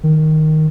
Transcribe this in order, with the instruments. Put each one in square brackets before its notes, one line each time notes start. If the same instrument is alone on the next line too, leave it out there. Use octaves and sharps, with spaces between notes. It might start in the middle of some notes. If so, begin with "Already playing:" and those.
[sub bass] D#3